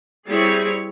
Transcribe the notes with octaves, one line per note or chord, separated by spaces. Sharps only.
G3 C4 E4 G#4 C#5